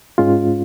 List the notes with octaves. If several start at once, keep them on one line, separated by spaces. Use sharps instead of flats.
G#2 G#3 C#4 F4